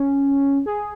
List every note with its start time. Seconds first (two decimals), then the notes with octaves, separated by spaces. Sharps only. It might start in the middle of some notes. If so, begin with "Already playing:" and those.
Already playing: C#4
0.66 G#4